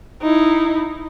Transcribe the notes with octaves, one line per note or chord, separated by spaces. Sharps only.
D#4 E4